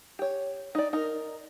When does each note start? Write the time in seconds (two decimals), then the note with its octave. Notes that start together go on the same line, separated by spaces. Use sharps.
0.19 G4 C#5
0.75 D#4 D5
0.93 D#4 A#4